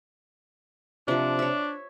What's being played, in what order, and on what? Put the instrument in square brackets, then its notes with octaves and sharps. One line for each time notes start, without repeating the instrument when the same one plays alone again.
[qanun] C3 F3 [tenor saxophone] D4
[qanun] C#5 E5